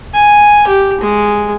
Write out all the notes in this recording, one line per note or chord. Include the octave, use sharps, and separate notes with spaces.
G#5
G4
G#3